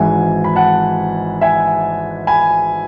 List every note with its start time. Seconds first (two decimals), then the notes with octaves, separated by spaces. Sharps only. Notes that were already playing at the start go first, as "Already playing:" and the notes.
Already playing: G#1 G#2 E3 E5 G#5
0.44 B5
0.56 F#5 A5
1.41 E5 G#5
2.27 G#5 B5